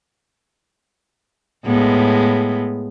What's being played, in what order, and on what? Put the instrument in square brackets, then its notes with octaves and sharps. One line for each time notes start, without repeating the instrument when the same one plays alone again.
[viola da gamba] A2 G#3 B3